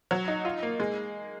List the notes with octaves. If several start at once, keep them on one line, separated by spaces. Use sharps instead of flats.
F#3
D#4
F4
A#3
G#3